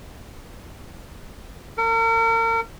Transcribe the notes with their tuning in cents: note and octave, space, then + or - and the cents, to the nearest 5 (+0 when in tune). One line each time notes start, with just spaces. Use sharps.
A#4 -40